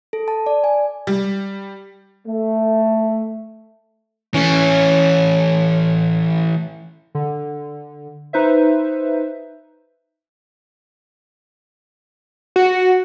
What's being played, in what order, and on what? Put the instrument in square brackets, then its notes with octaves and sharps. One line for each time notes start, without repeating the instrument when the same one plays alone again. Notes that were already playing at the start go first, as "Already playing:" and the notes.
[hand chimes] A4
A5
D5
G#5
[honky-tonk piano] G3
[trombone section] A3
[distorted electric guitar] E3 A3 [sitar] C#4
[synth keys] D3
D#4 B4 C5 E5
[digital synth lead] F#4